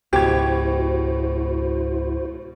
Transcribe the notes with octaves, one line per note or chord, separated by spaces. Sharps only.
C#2 G#2 B2 E4 F#4 G4 C5 G#6